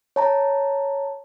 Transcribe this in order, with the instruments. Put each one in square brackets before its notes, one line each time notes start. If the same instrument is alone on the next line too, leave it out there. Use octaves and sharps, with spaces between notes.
[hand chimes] C#5 A5 A#5